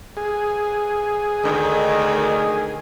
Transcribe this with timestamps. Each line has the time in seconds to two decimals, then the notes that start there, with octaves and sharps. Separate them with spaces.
0.17 G#4
1.44 D2 D#3